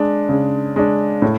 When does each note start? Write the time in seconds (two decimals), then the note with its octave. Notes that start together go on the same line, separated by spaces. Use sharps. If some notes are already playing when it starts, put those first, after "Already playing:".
Already playing: G#3 D4
0.29 C#3
0.76 G#3 D4
1.22 A2